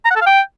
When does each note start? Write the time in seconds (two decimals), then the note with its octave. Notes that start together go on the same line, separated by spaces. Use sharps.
0.05 A#5
0.11 F#5
0.16 A4
0.21 F5
0.26 G5